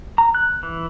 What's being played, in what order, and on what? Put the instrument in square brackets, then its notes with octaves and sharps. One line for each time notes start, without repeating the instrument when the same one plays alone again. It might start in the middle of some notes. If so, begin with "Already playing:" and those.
[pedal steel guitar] A#5
F#6
E3